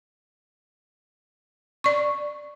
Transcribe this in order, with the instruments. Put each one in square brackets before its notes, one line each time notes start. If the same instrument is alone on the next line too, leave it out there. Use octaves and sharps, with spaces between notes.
[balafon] D5 C#6